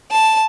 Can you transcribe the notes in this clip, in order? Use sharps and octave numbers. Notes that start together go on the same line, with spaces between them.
A5